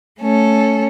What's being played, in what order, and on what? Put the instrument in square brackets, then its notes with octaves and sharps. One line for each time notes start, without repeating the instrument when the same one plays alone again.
[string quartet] A3 C#4 A4